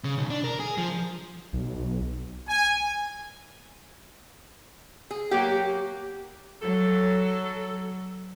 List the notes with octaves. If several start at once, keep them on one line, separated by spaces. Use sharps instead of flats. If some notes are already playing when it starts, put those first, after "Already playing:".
C#3
B1
D4
A#4
G#4
F3
B1
G#5
G#4
F#3 A#3 G4
F#3 A4